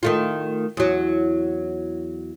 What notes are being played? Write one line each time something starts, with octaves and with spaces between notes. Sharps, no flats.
D#3 A3 F4
E2 F#3